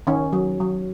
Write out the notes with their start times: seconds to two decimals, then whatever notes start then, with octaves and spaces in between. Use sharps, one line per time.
0.07 D#3 C#4
0.33 F#3
0.60 F#3